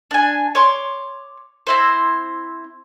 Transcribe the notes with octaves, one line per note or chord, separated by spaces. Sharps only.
D4 G#5
C#5 C6 D6
C4 E4 C5